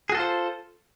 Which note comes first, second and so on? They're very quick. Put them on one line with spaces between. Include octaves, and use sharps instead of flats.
G#4 F#4 A4 F4 C5